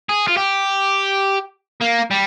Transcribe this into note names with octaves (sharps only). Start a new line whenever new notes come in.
G#4
F4
G4
A#3
G3